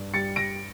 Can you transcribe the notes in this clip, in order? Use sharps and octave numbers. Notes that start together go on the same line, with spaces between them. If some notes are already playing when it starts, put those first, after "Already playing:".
Already playing: G2
G3 A6 C#7
A#6 D7